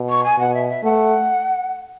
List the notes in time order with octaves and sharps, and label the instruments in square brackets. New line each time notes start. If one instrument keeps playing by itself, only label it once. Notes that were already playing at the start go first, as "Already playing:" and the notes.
Already playing: [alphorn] B2
[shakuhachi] C#6
G#5
[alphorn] B2 [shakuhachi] F#5
[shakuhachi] E5
E5
[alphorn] A3 [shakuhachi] F#5